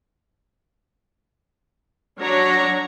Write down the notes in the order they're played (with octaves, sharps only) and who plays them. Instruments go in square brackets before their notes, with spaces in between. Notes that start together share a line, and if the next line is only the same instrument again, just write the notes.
[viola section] F#3 D4 C#5 A#5